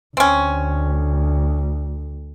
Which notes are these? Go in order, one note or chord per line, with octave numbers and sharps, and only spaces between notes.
D2 C4 C#4